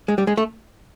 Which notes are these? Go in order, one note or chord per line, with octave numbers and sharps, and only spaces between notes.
G#3
G3
G#3
A3